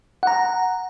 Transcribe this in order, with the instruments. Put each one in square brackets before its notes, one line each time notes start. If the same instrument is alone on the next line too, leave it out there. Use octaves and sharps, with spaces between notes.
[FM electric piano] F#5 A#5